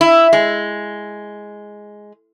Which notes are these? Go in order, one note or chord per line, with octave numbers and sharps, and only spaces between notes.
E4
G#3